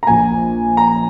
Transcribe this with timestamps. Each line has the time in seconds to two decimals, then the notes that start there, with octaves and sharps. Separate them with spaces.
0.03 A#5
0.07 A#1 A#2 G#5
0.77 A#5